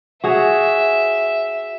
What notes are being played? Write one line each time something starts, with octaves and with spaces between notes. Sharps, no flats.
F#4 G#4 C#5 E5